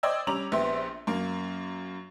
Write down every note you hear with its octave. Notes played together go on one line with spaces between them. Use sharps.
C5 D5 D#5 G5 E6 G#6
G3 C#4 A#5 D6 F7 F#7
A#1 B3 C4 G4 E5 C6
F#2 A#3